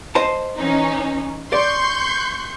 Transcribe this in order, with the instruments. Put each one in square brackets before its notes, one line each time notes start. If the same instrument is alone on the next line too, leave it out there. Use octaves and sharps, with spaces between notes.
[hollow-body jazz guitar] C5 D#5 A5
[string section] E3 C#4 D#4
[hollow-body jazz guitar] D5 [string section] C6 C#6 G6